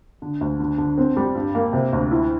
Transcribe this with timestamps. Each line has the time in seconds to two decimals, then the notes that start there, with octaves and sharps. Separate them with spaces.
0.22 D3
0.41 D2
0.60 D3
0.78 D3
0.98 C4
1.17 G3
1.35 G2
1.55 A#3
1.73 C3
1.93 D2
2.11 E4